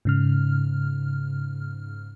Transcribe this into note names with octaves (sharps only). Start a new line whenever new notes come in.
G#2 C#3 F6